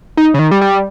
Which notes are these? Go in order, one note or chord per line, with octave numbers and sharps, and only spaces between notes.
D#4
C#3
D#3
G3
G3